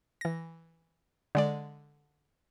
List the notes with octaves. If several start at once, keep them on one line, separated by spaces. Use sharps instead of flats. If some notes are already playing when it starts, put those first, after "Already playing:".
E3 A#6
D3 G#3 D5